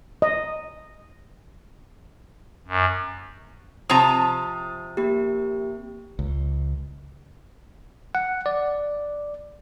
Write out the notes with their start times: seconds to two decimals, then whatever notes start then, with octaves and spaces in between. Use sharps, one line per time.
0.22 D#5
2.68 F#2
3.90 C3 F3 A#5 D#6
4.97 A#3 G4
6.19 C#2
8.15 F#5
8.46 D5